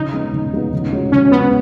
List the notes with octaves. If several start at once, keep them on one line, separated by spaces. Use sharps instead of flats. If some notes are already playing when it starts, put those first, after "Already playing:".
Already playing: C#3 D#4
G#3 B3
C#3
G#3 B3
C#3
G#3 C#4 F#4
C#3 C#4
G#3 B3 C#4 F#4